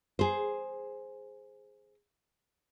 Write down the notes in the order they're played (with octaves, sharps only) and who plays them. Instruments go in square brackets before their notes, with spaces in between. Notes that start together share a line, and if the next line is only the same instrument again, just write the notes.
[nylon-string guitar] G#4 C5